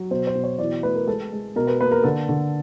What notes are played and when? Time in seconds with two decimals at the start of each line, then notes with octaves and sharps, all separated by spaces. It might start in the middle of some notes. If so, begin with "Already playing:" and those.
Already playing: F#3
0.11 B2 C5
0.27 C5
0.35 B2
0.44 C#5
0.59 E3 D5
0.83 A3 B4
0.95 A#4
1.07 G#3 A4
1.32 G#3
1.56 B2 A#4
1.67 B4
1.81 A#3 B4
1.92 A#4
2.04 D3 A4
2.29 D3